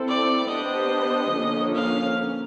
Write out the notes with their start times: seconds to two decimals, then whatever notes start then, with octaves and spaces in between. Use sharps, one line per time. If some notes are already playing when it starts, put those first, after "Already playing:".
Already playing: C4 E4 A4
0.09 D5
0.49 B3 D4 G4 C5 D#5
1.33 D3 F3 A#3 C#4
1.75 F5